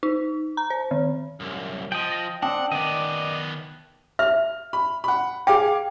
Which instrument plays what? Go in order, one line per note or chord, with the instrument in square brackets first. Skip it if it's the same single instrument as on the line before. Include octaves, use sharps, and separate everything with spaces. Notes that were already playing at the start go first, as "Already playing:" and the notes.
[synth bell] D#4
A#5
C5
D#3
[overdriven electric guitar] C2 F#2
[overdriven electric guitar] F3 [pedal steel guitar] D#5 G5
[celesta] A#6
[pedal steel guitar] C4 D4 [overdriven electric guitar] F#5 [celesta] G5 A5 D#6
[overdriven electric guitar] D#3 B3 [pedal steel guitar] D5 D#5
[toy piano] E5 [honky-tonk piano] F6
[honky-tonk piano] B5
F#5 B5
[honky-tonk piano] G#4 F5 D6 [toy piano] G5